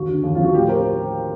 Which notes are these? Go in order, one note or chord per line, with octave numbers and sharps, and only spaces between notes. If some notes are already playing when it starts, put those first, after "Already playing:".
Already playing: D#2 F#4
D3
D#2
F3 F4
F#4
A2 F4 G4
A#4 C5